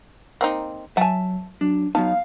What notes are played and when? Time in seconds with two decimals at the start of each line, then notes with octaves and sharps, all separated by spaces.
0.41 A#3 C4 D#4
0.97 F#3 E5 F#5 G#5 A5
1.61 F#3 D4
1.95 F#3 B3 D#4 F5 A5